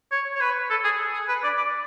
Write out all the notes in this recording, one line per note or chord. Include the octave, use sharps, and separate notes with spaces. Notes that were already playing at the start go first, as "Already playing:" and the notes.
C#5
C#5
B4
A4
G#4
G#4
B4
D5
D5